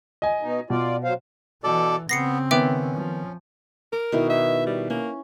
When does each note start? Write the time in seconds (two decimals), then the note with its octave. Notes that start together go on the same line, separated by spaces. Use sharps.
0.22 D#5 G#5
0.42 B2 D#4
0.70 B2 F4 D5
1.04 F#3 C5 F5
1.64 B2 E3 A4 D5
2.09 C#3 B3 C4 A#6 C7 C#7
2.51 D#3 B3 C#4 E5 G5 D6
2.95 F3
3.93 A#4 D6
4.12 B2 D#3 E4
4.30 E5
4.66 G3
4.90 A#3 C#4